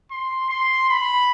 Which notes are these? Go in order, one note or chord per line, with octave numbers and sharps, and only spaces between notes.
C6
C6
B5